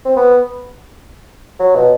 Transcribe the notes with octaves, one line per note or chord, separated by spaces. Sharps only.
C4
B3
F#3
B2